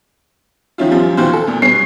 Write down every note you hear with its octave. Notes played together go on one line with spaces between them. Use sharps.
D#3 F3 C4 C#4 E4 F4
F#2 F3 G3 F4
D#2 D#3 E3 F4 F#4 C5
A4
D2 A#2
G2 B2 B4 C#5 C7